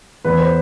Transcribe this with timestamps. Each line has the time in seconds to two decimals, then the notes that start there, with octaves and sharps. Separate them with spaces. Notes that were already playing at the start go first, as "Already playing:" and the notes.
0.25 E2 B4
0.38 C5